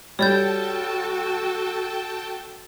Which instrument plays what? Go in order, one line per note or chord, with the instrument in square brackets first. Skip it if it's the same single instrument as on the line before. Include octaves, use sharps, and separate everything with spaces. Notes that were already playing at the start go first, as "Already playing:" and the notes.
[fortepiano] G3 [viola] F#4 A4 [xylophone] C#5 D5 G6 [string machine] G5 A5